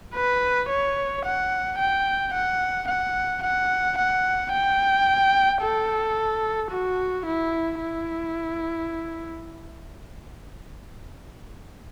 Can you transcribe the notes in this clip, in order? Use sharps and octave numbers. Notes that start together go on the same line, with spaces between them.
B4
C#5
F#5
G5
F#5
F#5
F#5
F#5
G5
A4
F#4
E4
E4